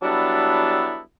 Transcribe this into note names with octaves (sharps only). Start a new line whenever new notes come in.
F#3 G3 B3 D4 E4 A4